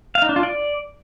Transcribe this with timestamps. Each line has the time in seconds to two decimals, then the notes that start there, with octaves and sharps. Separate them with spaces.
0.15 F5
0.22 D#4
0.29 D4
0.36 F4
0.43 D5